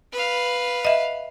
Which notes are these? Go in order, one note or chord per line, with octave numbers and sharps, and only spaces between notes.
B4 F5
D#5 E5